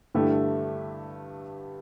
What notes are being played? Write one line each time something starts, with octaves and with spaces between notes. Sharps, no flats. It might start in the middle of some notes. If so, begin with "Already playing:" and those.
G2 D3 A3 E4 G4